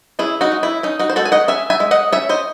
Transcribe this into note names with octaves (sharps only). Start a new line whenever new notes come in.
C#4 E4 G#4
D#4 F#4
G#3
E4
C#4 D#4
D#4 F#4
C5
G#3 F#4 A4
G#5
D#5 F#5
C#4 E5 G#5
E5 G#5
G#3
D#5 F#5
C#4 C#5 E5
C5 D#5